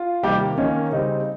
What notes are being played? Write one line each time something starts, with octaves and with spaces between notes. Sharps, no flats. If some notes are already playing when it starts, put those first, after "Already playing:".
Already playing: F4
C3 D#3 G3 A#3 G4
D#3 A#3 C#4
C#3 G3 C4 D#4